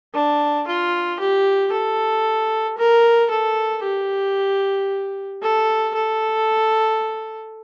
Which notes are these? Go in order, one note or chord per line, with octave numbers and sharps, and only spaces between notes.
D4
F4
G4
A4
A#4
A4
G4
A4
A4